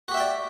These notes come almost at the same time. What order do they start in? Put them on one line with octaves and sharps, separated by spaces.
F#4 G4 E5 G5 D5